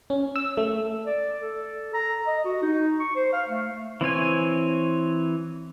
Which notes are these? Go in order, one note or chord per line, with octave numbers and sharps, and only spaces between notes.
C#4
E6
A3
D5
A4
A#5
D#5
F#4
D#4
C#6
C5
F5
A3
E3 C4 C#5 G#5